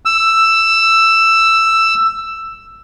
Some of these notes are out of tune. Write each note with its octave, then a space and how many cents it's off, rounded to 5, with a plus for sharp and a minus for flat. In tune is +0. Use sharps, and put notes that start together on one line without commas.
E6 +10